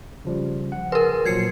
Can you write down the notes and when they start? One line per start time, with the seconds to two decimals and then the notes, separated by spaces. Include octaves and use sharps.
0.25 C#3 F3 G3
0.72 F#5
0.92 G#4 A#4 B4 C6
1.25 A#2 F3 F#3 G#6 C7 C#7